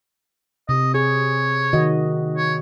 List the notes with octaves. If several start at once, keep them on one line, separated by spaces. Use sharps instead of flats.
C3 D#5
G#4 C#5
D#3 F#4 D#5
C#5